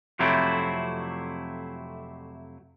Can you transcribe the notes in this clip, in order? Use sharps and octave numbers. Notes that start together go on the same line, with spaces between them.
F2 C3 F#3 A3 C4 E4